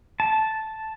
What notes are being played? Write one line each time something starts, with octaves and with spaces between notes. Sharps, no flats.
A5